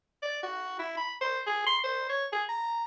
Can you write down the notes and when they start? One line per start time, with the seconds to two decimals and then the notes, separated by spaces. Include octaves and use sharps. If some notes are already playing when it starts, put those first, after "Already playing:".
0.23 D5
0.43 F#4
0.79 E4
0.97 B5
1.21 C5
1.47 G#4
1.66 C6
1.84 C5
2.10 C#5
2.33 G#4
2.49 A#5